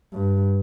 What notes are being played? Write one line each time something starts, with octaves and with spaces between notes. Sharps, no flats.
G2